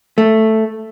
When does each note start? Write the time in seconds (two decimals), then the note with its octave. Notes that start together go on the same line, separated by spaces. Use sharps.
0.18 A3